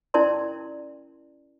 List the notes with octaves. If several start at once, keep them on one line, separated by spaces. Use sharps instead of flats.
C#4 E4 A#4 D5 A5 C6